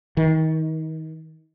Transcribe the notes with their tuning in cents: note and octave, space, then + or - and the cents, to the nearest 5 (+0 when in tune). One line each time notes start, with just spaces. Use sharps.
D#3 +30